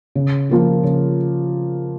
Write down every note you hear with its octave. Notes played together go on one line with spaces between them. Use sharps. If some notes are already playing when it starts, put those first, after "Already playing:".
C#3
F3 A#3 F4
C#3